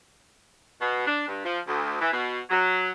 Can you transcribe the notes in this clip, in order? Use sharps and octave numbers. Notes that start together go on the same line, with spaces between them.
B2
D4
G2
F3
D2
E3
B2
F#3